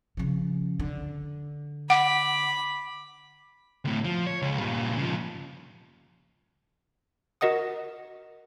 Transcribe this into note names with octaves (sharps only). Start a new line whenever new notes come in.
C#3 F3
D3
F#5 B5 D6
D2 A2
F3
C#5
C#2
G2 A#2
C#3 F3
F#4 A#4 D#5 F#5 D#6